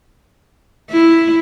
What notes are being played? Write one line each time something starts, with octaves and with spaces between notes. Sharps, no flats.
E4